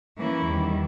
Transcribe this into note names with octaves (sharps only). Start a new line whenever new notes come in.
E3 A#3 C#4 E4
E2 D#3 G3